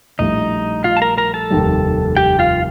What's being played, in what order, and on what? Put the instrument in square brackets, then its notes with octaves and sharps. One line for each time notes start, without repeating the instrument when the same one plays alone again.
[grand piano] A#1 A2 G3 [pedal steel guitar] D#4 D#5
[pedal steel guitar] F4 F5
A5
A#4 A#5
A#4 A#5
A4 A5
[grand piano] F1 D#2 D#3 G3
[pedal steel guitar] G4 G5
F4 F5